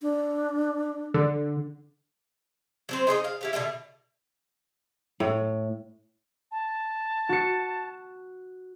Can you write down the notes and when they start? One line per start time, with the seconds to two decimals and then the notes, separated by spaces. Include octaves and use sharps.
0.02 D4
1.14 D3
2.89 F#3 C4 C5
3.07 D#4 G#4 C5 D#5
3.24 F5
3.41 E4 G4 C#5
3.53 B2 D3 F#3 E5
5.20 A2
6.51 A5
7.29 F#4 C#7